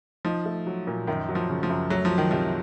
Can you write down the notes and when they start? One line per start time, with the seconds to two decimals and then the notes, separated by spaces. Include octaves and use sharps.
0.25 F3 D#4
0.45 A3
0.66 F#3
0.87 A#2
1.07 F#2 D#3
1.29 F#3
1.35 F3
1.49 C#3
1.63 F3
1.70 F#2
1.90 F#3 A3
2.05 F3
2.11 F#3
2.18 D#3
2.31 C3 F3